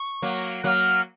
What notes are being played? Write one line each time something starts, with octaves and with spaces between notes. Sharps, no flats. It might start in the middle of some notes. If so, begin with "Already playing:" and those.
Already playing: C#6
F#3 A#3
F#3 A#3 F6 F#6